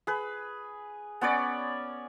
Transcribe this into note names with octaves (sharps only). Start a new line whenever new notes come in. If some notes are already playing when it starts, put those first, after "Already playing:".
G#4 B4
B3 C#4 C#5 D5